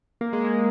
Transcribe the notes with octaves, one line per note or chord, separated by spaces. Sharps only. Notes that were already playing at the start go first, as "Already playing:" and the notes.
A#3
G#3
A#3